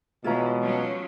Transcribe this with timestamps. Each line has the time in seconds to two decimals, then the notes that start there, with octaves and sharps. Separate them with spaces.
0.24 B2 E3 G#3 F4 C#5 A#5
0.61 F3 F#3 C#4